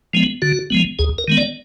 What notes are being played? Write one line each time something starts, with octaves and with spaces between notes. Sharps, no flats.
F3 G#3 B3
D3 F#4
F3 G#3 B3
D#2 G#4
A#4
D#3 G#3 B3
D5